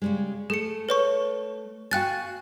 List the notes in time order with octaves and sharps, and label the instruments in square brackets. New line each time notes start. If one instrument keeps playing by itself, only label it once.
[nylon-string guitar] C#3 G3 G#3
[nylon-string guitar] A3 [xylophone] G#4 C#7
[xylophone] B4 C#5 C#6
[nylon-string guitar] F#4 F5 G#5 [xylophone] G5 F#6 A6